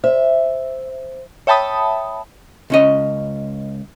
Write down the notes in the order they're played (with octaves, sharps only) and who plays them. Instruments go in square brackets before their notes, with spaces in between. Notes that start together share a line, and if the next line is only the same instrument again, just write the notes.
[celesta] C5 [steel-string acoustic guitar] E5
[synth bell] C#5 E5 G5 A5 B5 D#6
[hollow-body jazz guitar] C#2 C#4 D#5